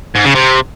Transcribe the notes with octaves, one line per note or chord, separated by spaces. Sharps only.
G#2
C#3
C3